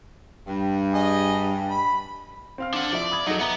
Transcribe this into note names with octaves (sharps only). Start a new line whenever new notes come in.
G2
G#4 D#5
B5
C4 F5 F6
D4 F#5
F3 E4 D5 E5
B5 D#6 G#6
F#3 D#4 A4
B3 E5 A#5 G7